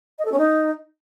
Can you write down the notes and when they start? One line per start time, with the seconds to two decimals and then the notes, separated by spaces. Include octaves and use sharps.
0.19 D#5
0.25 A4
0.32 C#4
0.38 D#4